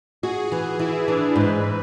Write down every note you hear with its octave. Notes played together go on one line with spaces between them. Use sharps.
F#4 G#4
E3
E3 E4
E3 D4
G#2 B4